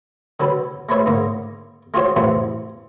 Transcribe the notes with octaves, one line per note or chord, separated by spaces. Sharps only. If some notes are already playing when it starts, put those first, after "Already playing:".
D3 F#3 A4 B4
G#3 A3 B4 C#5 E5
G#2 D3 A#3
G#3 F4 F#4 G#4 C5 C#5
A1 F2 C3 E3